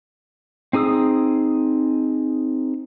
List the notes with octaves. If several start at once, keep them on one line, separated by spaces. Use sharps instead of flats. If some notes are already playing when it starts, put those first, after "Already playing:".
C4 D#4 G#4 D#6 E6